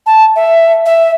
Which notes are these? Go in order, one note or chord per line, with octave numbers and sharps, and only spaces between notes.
A5
E5
E5